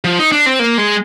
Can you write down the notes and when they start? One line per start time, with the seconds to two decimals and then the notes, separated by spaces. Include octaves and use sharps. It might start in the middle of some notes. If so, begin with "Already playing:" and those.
0.04 F3
0.19 D#4
0.32 D4
0.46 C4
0.59 A#3
0.78 G#3